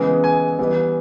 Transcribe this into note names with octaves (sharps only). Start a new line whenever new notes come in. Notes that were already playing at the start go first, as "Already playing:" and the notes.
Already playing: C#3 E3 G#3 B3
G#5
E3 G3 B3